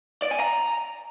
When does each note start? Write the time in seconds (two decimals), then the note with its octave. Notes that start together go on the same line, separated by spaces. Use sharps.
0.22 D5
0.31 G#5
0.40 A#5